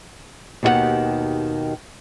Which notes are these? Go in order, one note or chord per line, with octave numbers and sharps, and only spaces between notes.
D#2 B2 D#3 F4 G4 F#5